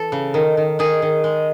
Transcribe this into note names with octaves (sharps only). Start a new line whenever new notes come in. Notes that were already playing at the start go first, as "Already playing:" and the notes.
Already playing: E3 A4
C#3
D#3
D#3
D#3 G#4
D#3
G#3